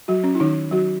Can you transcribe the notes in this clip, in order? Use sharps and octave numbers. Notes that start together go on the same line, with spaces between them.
F#3 F#4
C#4
E4
D#3 D#4
F#3 F#4